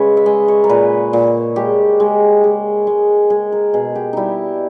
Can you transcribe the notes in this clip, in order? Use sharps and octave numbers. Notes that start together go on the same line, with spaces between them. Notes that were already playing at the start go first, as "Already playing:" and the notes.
Already playing: C#3 G#3 B4 C#5
E5
G#3 D#5
C#5
A#4
A#2 B4
A#2
G#3 G4
G#3
G#3
G#3
G#3 G#4
A#4
B2 G#4
G4
G3 D#4 E4